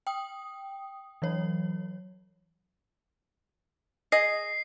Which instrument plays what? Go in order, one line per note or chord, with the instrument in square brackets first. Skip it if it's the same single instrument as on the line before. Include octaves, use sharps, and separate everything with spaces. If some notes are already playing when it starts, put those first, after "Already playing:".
[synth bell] G5 D#6
E3 F#3 C#5
[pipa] G#4 D#5 [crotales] C7